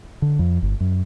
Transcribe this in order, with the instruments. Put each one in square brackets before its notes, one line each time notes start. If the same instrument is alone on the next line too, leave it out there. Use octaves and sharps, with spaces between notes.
[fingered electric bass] D3
F2
G1
F#2